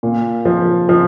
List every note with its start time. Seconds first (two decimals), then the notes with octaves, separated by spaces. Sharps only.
0.03 A#2
0.45 F3
0.89 F3